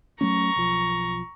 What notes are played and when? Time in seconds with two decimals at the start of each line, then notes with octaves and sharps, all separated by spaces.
0.21 F#3 A3 C#4 A#5 C#6
0.56 B1 F3